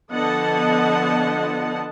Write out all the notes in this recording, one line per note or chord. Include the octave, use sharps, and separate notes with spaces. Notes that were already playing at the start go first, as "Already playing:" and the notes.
D3 F3 B3 D#5 F#5 A5